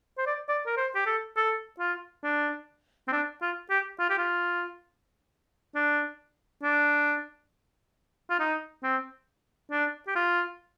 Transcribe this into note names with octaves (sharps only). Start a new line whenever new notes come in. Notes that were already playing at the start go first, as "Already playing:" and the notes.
C5
D5
D5
A#4
C5
G4
A4
A4
F4
D4
C4
D4
F4
G4
F4
G4
F4
D4
D4
F4
D#4
C4
D4
G4
F4